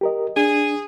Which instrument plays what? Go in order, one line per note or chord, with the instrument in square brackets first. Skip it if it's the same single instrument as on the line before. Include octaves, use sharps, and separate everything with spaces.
[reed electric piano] G4 A#4 D#5
[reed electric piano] D4 [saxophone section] G#4